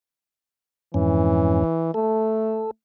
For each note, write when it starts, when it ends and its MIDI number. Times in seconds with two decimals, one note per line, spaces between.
0.94 1.64 41
0.94 1.64 44
0.94 1.92 52
0.94 1.64 61
1.94 2.67 57
1.94 2.71 69